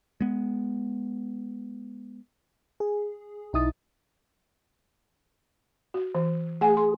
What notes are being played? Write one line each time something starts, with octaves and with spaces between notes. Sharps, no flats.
G#3 B3
G#4
B1 D#4 E4 D#6 A6
F#4
E3
A3 G#4 F#5 G#5
C6